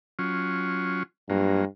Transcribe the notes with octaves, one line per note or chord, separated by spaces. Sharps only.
F#3 C#4 F4
G2 F#3 A#3 F4